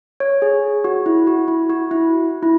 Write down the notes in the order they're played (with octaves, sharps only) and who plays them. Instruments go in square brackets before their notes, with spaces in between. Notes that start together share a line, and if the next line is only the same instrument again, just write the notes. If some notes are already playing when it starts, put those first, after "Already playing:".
[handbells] C#5
G#4
F#4
E4
F#4
E4
F#4
E4
E4